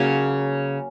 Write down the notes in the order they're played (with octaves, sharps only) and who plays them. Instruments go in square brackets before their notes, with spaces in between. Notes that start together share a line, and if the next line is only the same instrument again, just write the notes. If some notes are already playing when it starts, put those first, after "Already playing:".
Already playing: [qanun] C#3 F#3 A#3 C#4